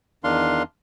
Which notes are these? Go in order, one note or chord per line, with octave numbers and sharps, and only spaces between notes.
E2 D#3 D4 F5 C6